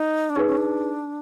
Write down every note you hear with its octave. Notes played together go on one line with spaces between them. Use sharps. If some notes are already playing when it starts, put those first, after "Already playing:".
Already playing: D#4
D4
C#4 D#4 G#4 B4
C#4
D4